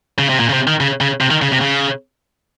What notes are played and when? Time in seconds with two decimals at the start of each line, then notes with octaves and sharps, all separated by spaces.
0.19 C#3
0.29 C3
0.40 A#2
0.49 C#3
0.53 C3
0.67 D#3
0.80 C#3
1.01 C#3
1.21 C3
1.31 D#3
1.42 C#3
1.52 C3
1.61 C#3